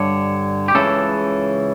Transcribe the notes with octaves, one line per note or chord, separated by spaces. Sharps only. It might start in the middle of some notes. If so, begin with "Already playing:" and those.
Already playing: G2 D3 C#5
G4
C#2 C#3 E3 A4